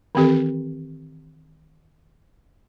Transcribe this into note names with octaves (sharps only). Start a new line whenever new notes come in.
D#3 E3 C4 G4 A4